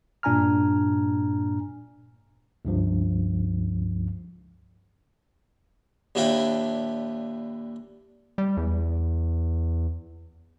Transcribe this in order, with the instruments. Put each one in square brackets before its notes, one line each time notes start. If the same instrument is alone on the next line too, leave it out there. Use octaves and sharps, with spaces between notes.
[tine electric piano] G2 A#2 D4 G#5 A#5 F6
C#2 G2 F3
[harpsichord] D#2 A#2 D4 E4 G5 B5
[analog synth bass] G3
E2